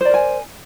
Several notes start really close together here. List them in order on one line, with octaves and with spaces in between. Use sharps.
C5 D5 A#4 G#5